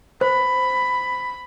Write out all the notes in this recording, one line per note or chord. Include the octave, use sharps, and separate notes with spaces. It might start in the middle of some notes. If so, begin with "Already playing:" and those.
C5 B5